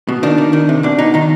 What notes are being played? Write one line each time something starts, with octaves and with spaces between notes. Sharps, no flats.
B2
D#3 D4
D#3
D#3
C3
B2 D4
B2 D#4
D#3 D#4